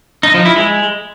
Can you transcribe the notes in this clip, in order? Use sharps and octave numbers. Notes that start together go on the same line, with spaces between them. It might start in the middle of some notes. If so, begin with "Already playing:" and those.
D#4
F3
E4
G#3